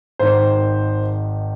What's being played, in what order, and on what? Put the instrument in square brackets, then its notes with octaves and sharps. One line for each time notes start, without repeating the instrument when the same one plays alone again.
[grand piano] G#1 G#2 D#3 C5